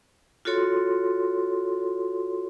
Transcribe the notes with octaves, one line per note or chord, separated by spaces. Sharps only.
F4 F#4 A4 C#5 C6